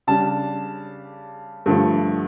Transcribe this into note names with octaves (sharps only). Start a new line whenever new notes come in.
C#3 G3 D4 A5
G2 D3 F3 A3